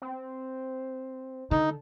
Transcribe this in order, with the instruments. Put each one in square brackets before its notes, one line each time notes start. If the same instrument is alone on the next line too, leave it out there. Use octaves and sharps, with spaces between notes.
[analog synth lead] C4
[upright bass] D3 [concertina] D#4 [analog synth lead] A4